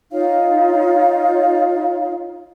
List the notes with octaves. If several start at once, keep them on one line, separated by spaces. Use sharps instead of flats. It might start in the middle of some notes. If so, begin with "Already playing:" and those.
D#4 F4 C#5 F5